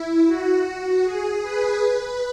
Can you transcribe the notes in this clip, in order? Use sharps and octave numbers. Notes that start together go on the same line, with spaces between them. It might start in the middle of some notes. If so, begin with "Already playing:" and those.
Already playing: E4
F#4
G#4
B4
B4